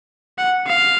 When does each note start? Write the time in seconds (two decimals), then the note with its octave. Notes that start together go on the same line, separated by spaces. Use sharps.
0.38 F#5
0.67 F5